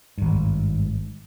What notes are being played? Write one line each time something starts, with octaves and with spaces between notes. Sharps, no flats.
G#1 G2